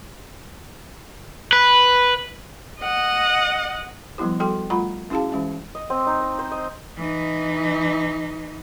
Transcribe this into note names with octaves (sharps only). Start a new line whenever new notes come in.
B4
D#5 F#5
F3 G3 B3 E4 G4
G3 F#4 A4 G5 C6
G3 A3 F4 F#5 A#5 B5
C#4 E4 F#4 G#4 F5 A5
E3 G#3 C#4
D#5
C4
D#4
D#5
C5
D#5
E3 D#4